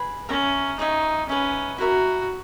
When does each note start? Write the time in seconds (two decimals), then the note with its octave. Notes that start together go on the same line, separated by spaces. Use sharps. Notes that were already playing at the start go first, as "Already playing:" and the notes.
Already playing: G#4 B4
0.29 C#4 A#4 E5 A#5
0.79 D#4 G#4 C#5 E5
1.29 C#4 G#4 B4 E5
1.78 E4 F#4 A#4 E5